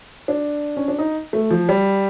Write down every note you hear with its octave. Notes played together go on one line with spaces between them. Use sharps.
D4
C#4
D4
D#4
A3
F3
G3